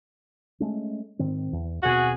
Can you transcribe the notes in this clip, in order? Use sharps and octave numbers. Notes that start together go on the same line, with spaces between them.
G#3 A3 C#4
G#2 D#3 C4
E2
D#1 B2 C4 F#4 G#4